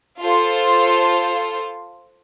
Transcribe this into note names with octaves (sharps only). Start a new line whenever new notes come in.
F4 A4 C5